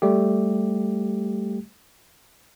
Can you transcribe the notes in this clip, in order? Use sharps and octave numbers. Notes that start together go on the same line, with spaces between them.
G3 A3 G4